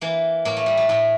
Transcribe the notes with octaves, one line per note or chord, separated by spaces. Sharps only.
E3 A#3
A2 A#3
A3
G3
A3
A2 A3